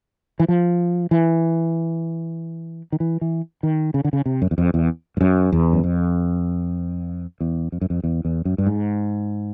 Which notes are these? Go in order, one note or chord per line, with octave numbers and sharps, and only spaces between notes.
E3
F3
E3
D#3
E3
E3
D#3
C#3
D3
C#3
C3
F#2
E2
F2
E2
G2
F#2
E2
F#2
F2
E2
F2
F#2
F2
E2
E2
F#2
G2
G#2